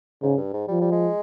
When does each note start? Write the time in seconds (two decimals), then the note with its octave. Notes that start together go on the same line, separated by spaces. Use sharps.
0.22 G#2 C#3
0.37 G2
0.54 G#2
0.68 F3 G3
0.81 G3
0.92 G#3